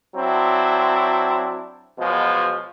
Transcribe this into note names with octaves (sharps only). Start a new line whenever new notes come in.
F#3 C4 D4 E4
B2 F3 F#3 G#3